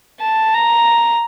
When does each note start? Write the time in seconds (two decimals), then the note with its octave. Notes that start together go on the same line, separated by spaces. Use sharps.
0.21 A5
0.54 A#5